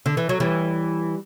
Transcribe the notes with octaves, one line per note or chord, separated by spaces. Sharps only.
D3
E3
F#3
E3 G3